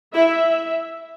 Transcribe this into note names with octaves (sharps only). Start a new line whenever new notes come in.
E4 E5